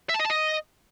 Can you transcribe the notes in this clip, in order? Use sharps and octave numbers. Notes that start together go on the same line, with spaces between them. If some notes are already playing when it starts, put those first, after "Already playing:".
E5
A5
D#5
A5
D#5